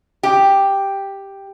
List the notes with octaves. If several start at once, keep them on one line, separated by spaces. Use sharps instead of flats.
G4